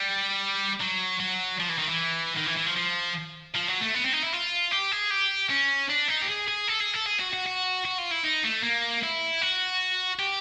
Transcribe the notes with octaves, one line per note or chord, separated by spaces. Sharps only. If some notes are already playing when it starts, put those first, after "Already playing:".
Already playing: G3
F#3
F#3
F3
E3
D#3
E3
D#3
E3
E3
F3
F3
F3
F#3
A3
B3
C4
D#4
E4
F4
G4
G#4
G4
C#4
D4
D#4
G4
G#4
G#4
A4
G#4
A4
G#4
F#4
F#4
F#4
F#4
F4
E4
D#4
A3
A#3
E4
F#4
G4